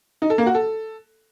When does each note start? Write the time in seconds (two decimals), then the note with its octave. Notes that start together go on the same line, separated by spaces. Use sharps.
0.22 D#4
0.30 A4
0.38 A#3
0.46 F#4
0.55 A4